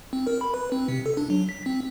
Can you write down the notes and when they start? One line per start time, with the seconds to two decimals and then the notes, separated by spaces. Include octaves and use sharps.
0.13 C4
0.27 A#4
0.41 B5
0.54 B4
0.72 C4
0.88 C3
1.06 A4
1.17 D4
1.30 F#3
1.49 B6
1.66 C4